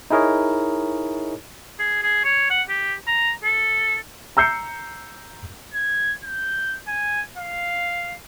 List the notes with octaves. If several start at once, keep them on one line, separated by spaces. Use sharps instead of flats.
D#4 E4 G#4 A#4 C#5 D#5
G#4
G#4
C#5
F#5
G4
A#5
A4
A#5 E6 G6 C7 C#7
G#6
G6
G#5
F5